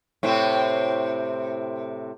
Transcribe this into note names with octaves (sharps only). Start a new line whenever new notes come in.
A2 C3 C4